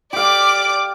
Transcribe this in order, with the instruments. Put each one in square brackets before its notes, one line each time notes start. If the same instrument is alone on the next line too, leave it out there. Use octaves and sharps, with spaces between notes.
[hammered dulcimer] G4 F5 [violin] D5 D6